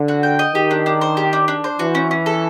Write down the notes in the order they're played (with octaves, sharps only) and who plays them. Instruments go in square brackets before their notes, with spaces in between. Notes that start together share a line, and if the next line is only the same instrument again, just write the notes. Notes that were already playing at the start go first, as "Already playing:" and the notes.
Already playing: [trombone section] D3
[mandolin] F#4
G5
D#5
[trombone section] D#3 [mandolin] G4
[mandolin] D4
D4
C5
G4
D4
D4
C5
[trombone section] E3 [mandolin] F#4
[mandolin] C#4
C#4
A4